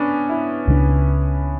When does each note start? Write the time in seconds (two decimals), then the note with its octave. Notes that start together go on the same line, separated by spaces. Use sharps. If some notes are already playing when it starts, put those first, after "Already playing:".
Already playing: B3 C#4 D4
0.29 E4
0.67 C#2 C#3 G#3 D4